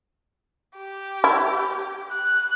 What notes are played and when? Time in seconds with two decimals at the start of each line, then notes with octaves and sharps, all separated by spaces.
0.79 G4
1.24 E4
2.11 F#6